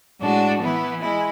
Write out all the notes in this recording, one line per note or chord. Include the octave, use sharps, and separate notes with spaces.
A2 G#3 D4 F#4
E3 B3 E4
G#3 E4